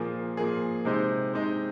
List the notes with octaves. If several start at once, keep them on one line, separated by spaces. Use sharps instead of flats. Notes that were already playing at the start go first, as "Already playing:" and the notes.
Already playing: A#2 F3 A#3 G#4
A#2 F3 A#3 G#4
C3 G#3 D#4 C5
C3 G#3 D#4 C5